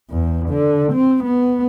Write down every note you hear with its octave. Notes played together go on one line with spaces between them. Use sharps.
E2
D3
C4
B3